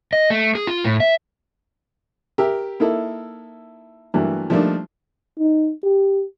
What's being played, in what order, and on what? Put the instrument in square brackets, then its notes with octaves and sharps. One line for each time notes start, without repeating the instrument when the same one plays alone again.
[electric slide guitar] D#5
A3
G#4
F4
A2
E5
[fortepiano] G4 A#4 E5
A#3 D#4 E4 A4
G2 E3 F#3 A3 A#3
F3 G3 A3 A#3 D4 D#4
[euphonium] D#4
G4